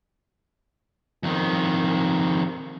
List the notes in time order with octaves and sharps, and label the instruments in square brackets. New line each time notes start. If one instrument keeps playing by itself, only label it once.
[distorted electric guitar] F2 D#3